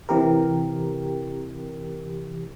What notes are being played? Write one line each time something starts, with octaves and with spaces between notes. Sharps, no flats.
C3 E3 G4 A#4